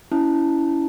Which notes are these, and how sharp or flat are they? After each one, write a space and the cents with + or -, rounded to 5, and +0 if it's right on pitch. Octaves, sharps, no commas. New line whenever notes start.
C#4 +25 E4 +0 A5 +0